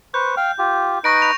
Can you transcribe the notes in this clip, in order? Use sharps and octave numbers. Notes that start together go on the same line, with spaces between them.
B4 C5 C#6 G6
F5 G5 F6
F4 G4
D#4 B4 B5 C#6 A#6 D7
F7